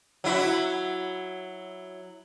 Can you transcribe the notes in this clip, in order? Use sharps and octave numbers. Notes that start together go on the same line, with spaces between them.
F#3 E4 F#4